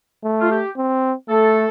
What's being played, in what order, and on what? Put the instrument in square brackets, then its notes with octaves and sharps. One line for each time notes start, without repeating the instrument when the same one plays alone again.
[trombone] A3
[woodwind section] F4
G4
[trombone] C4
[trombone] A3 [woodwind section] A4